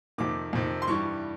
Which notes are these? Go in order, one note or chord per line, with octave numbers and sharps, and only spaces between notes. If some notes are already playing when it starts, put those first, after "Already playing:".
F2 C3 D#3 D6
F2 C3 D#3
C6
G2 E3 G3 C#6